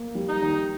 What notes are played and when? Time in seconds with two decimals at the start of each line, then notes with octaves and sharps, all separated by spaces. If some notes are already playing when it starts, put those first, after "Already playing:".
Already playing: A#3
0.15 G3
0.28 D#4
0.42 D#3